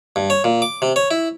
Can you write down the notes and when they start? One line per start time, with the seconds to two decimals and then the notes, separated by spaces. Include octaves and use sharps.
0.16 G2
0.30 C#5
0.44 A#2
0.62 D6
0.82 C3
0.96 C#5
1.11 E4